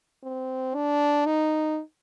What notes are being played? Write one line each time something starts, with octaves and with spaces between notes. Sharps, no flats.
C4
D4
D#4